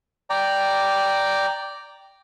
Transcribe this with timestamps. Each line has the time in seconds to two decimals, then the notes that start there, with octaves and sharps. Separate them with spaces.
0.30 D5 G5 A#5